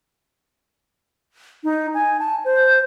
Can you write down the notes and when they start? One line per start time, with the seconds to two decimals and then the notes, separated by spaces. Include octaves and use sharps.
1.64 D#4
1.94 G#5
2.20 A5
2.45 C5